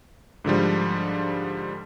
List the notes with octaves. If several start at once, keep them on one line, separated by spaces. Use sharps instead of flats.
G#2 D3 F3 G3